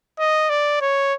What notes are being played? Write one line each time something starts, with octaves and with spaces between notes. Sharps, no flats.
D#5
D5
C#5